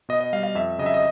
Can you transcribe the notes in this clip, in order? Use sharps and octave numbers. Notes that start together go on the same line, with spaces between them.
B2 D#5
D#5
G3 F5
F5
F2 E5
C#3 F#3 D#5
E5
D#5